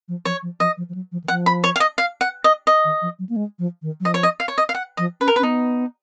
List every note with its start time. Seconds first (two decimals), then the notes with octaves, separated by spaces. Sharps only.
0.08 F3
0.25 F3 C#5
0.43 F3
0.60 F3 D#5
0.77 F3
0.89 F3
0.95 F#3
1.12 F3
1.24 D#3
1.28 F3 F#5
1.46 B5
1.64 C#5
1.76 F5
1.80 D#5
1.98 F5
2.21 F#5
2.44 D#5
2.67 D#5
2.84 D#3
3.02 F3
3.19 F#3
3.29 A#3
3.36 G#3
3.59 F3
3.82 D#3
4.00 F#3
4.05 F3 D#5
4.14 C#5
4.23 D#5
4.40 F5
4.48 C#5
4.58 D#5
4.69 F5
4.75 F#5
4.97 F3 D#5
5.21 C#4 B4
5.28 A#4
5.36 B4
5.39 C#4
5.43 B3 D#4